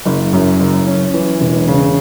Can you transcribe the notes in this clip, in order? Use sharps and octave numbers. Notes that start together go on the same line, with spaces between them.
F#1
F#2
F#1
C#4
E3
E1
C#3